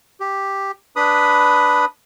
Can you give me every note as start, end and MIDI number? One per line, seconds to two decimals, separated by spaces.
0.20 0.71 67
0.96 1.85 62
0.96 1.85 71
0.96 1.85 83
0.96 1.85 87